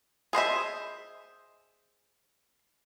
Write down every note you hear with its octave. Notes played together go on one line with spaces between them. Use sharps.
G#4 C5 D#5 E5